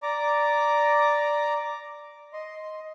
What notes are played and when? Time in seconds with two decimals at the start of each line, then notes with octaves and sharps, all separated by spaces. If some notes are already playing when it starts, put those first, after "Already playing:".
0.03 D5 A#5 D6
2.33 D#5 C6